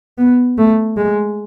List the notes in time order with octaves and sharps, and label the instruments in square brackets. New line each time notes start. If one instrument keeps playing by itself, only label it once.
[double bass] B3
A3
G#3